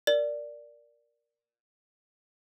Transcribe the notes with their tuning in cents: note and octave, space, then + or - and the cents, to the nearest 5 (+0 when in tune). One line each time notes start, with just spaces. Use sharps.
A#4 +5 D5 +0